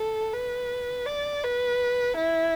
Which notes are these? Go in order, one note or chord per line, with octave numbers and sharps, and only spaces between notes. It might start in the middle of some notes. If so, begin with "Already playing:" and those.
Already playing: A4
B4
D5
B4
E4